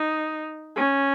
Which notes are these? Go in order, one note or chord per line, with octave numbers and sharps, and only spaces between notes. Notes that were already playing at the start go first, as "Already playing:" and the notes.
Already playing: D#4
C#4